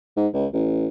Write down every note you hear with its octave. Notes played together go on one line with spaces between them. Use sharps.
G#2
C#2
A1